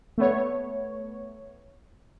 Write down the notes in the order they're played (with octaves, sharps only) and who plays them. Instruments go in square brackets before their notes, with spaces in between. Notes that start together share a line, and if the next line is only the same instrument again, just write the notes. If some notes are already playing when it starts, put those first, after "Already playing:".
[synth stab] A3 B3 C#5